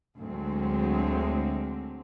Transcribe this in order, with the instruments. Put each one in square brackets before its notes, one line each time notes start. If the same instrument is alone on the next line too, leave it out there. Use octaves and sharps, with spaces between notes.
[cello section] D2 F#3 G#3 C4